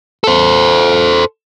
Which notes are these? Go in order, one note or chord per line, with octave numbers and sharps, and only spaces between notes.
A4 C5